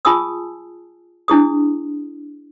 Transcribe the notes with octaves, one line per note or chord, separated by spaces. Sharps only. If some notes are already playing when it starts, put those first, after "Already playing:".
F4 G#4 G#5 A5 D#6 E6
D4 E4 G#4 D#6